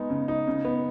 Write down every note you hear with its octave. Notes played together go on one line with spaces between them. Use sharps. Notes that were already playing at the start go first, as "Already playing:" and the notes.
Already playing: G#3 B3 D#4
C#3
D#4
C#3
B3